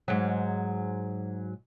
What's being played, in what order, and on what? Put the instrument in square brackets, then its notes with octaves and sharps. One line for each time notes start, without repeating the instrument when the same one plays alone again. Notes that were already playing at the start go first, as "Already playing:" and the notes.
[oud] G#2 F#3